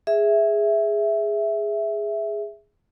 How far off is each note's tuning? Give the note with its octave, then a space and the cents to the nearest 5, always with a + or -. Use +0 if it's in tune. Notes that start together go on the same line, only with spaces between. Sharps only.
G#4 -5 E5 +0